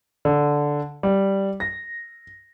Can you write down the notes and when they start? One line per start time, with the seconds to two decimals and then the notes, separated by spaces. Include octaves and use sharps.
0.25 D3
1.03 G3
1.60 A#6